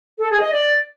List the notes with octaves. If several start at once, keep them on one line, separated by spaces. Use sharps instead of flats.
A4
G#4
D#5
D5